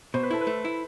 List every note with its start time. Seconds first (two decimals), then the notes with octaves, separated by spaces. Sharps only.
0.14 B2 C5
0.23 B4
0.31 E4 A4
0.41 B4
0.47 A3
0.65 E4